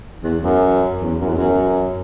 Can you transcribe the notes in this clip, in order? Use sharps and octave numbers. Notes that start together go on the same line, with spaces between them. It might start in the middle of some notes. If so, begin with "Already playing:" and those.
E2
F#2
E2
F#2
E2
F#2